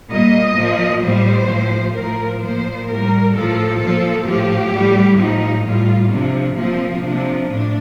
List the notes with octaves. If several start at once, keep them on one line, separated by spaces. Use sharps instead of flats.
A#2 G3 D#5
A#2 F3
A2 G3 C5
A2 F3
A2 F3 A#4
A#2 F3 C5
A2 G3 A#4
A2 F3 A4
A#2 F3 A4
A2 F3 G4
A2 G3
A2 F3 D#4
A2 G3 F4
C3 F3 D4
A#2 F3 C4
C3 F3 D4
A2 D4